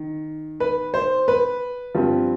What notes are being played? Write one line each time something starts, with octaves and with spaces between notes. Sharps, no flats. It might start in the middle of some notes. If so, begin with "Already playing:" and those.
Already playing: D#3
B4
C5
B4
G2 F3 C4